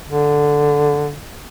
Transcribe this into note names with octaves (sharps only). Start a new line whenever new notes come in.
D3